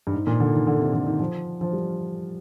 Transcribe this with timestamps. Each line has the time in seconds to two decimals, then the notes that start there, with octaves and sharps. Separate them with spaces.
0.07 G2
0.14 G#2
0.27 A#2
0.40 D3
0.53 D#3
0.67 D3
0.80 C3
0.93 D3
1.07 D#3
1.20 F3
1.61 F3
1.73 G3